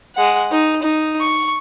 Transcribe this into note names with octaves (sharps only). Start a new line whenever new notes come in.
G#3 F#5
D#4
D#4
C#6